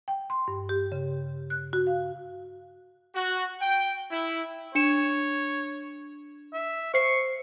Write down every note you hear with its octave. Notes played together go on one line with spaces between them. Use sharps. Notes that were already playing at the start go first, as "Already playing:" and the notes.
G5
C6
G2
G4
C#3
F#6
F#4
F5
F#4
G5
E4
D4 C#5 C#7 E7
E5
C5 C#6 C7 C#7